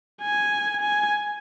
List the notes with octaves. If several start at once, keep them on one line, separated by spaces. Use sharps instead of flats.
G#5
G#5